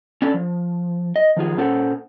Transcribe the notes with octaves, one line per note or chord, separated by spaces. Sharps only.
C#4 D4 A4
F3
D#5
D#3 F3 F4 G#4
A#2 C#4 A4 C5 F#5